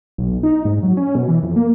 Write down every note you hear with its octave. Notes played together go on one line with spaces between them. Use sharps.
B1
D#4
G#2
F#3
C#4
B2
E3
F2
A#3